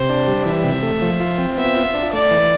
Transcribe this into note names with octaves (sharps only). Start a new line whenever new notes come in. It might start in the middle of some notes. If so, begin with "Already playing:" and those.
Already playing: C3 C5
D4
G3
E3 E5
C3
A3
F3
F4
C4
B3 E5
F4
D4
A3 D5
E3